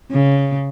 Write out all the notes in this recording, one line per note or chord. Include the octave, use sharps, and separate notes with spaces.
C#3